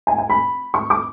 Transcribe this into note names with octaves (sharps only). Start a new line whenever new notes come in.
G#5
G#5
B5
C#6
D6